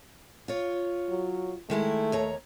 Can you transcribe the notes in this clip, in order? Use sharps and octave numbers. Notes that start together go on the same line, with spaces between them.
F4 C#5
F#3
D#3 G#3 A3 E4
D#2 C#5 A#5